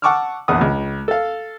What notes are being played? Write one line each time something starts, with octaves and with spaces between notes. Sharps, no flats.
F#5 A5 C#6 D6 E6 F6
A#1 E2 F#5 D#6
C#2
A4 F5